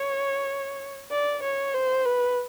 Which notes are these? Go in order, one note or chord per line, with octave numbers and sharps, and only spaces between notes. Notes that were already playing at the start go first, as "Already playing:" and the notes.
Already playing: C#5
D5
C#5
C5
B4